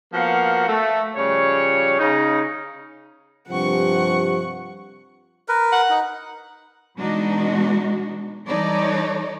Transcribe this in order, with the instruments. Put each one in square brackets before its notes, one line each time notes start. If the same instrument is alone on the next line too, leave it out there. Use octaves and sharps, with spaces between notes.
[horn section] F3 A#3 B3 F#4 F5 F#5
A3
C#3 F3 G3 C#5
C#3 D#4
[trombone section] G2 C3 F3 [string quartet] F#5 C#6
[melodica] A#4 B4
[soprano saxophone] F#5
[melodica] D#4
[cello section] B2 E3 G#3 D4 D#4 F#4
E3 G3 D#4 A4 C#5 D5